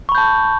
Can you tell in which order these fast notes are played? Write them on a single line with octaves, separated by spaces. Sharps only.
C#6 B5 G6 A5